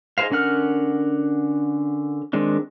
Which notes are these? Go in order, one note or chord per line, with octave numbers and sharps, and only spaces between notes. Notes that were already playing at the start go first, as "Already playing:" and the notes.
D#4 G#4 B4 C5 F5
D3 C#4 A#4 F#5 F6
D#3 G#3 C4 D4